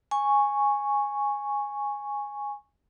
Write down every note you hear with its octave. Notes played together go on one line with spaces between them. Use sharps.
G#5 C#6